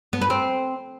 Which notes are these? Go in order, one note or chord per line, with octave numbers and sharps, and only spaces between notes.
B3
B4
C4